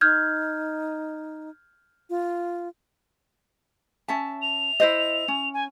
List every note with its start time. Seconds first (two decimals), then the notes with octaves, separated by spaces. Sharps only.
0.01 D#4 F6 G6 G#6
2.10 F4
4.08 C#4 E5 A5
4.41 F7
4.80 E4 C5 D#5
5.28 C#4
5.54 G#5